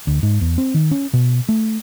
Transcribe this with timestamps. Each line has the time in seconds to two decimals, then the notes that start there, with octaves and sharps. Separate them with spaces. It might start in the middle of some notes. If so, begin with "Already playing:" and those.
0.07 D2
0.23 G#2
0.41 E2
0.58 C4
0.74 D#3
0.91 C#4
1.13 B2
1.49 A3